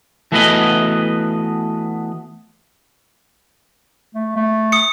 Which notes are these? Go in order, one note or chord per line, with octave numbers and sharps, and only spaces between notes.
E3 A3 B3 F#4 B4 D#5
A3
A3
D#6 C#7